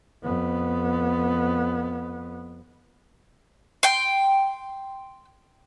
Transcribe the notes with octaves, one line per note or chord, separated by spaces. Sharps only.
F2 B3
G5 C6